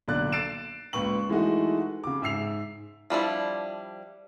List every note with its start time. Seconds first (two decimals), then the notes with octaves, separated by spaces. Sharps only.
0.08 B1 A#2 D3 D5 F#6
0.32 A6 C7 D7 E7
0.93 C#2 A#2 B4 C#6 F#7
1.29 E3 G#3 A3 D#4 F#4
2.04 C#3 D6
2.22 G#2 E5 E6 C7 F7
3.10 F3 G3 D4 E4